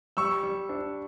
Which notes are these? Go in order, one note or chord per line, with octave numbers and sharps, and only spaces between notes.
G3 C#6 E6
G3
D4